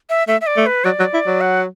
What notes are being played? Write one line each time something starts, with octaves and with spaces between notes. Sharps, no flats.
E5
A3 E5
E5
D5
A3
B4
F#3 D5
F#3
E4
F#3
F#5